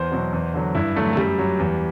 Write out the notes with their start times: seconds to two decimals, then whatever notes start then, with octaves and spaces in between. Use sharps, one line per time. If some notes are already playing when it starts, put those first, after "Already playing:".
Already playing: E2 C5
0.12 B2 F#3
0.33 E2
0.54 D3 F#3
0.75 G2 E4
0.96 D3 F#3 A3
1.13 A3
1.17 F#2 G3
1.38 F#3
1.59 E2